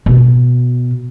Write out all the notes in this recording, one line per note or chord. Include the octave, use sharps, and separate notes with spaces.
B2